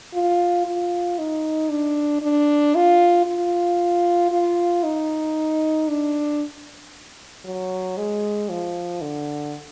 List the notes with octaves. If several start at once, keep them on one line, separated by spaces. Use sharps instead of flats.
F4
F4
D#4
D4
D4
F4
F4
F4
D#4
D4
F#3
G#3
F3
D3